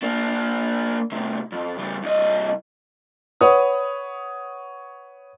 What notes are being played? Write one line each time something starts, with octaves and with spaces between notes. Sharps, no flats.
A#3 D4
A2 C3
F2
C#3 G3
C2 D#5
B4 C#5 F#5 D#6